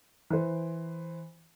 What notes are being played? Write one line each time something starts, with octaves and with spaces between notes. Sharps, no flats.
E3 C5